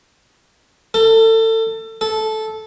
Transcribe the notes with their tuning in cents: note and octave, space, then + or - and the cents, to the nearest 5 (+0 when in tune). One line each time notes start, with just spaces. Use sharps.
A4 +30
A4 -10